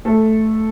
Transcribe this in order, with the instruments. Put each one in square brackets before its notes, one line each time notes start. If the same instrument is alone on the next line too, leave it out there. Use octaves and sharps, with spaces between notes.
[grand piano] A3 A4